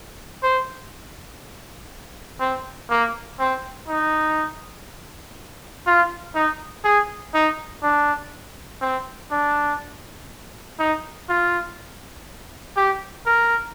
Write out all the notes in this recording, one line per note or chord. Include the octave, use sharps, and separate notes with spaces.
C5
C4
A#3
C4
D#4
F4
D#4
G#4
D#4
D4
C4
D4
D#4
F4
G4
A#4